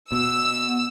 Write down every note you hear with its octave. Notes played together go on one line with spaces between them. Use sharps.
B2 E6